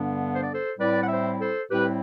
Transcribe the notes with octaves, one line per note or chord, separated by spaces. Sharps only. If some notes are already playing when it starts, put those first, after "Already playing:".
Already playing: G2 D3 G3 B3 D4
C5
D5
A4 C5
A2 G3 C4 E4 B4 D5
F#5
C5 E5
A4 C5
A2 G3 C4 E4 G4 B4